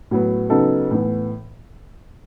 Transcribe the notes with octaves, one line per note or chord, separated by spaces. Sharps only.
A2 F#3 B3
C#3 F#3 B3 D#4 A4
A2 E3 B3